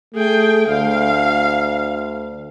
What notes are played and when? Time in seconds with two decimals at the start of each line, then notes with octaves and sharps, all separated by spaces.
0.15 A3 G#4 G5
0.68 D2 F5